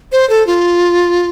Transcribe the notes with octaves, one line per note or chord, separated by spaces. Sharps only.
C5
A4
F4